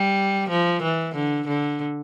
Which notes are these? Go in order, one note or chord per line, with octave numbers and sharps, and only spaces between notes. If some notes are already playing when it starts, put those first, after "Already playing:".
Already playing: G3
F3
E3
D3
D3